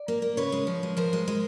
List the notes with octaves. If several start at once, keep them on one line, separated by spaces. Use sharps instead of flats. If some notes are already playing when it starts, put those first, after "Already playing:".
Already playing: D5
A#3
A#3
C#3 B4 C#5
G#3
F3
G#3
F3 A#4 C5
G#3
G#3